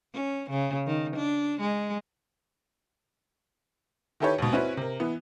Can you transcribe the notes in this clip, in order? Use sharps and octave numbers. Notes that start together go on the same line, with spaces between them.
C#4
C#3
D#3
D4
G#3
D#3 E4 G4 A4 B4 C#5
D#2 G#2 B2
C4 C#4 E4 F#4 B4 C#5
C3 A#4
E3 B3